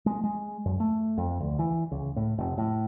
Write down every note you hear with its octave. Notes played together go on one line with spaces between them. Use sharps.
G#3
G#3
F#2
A3
F2
D2
E3
C#2
A2
F1
A2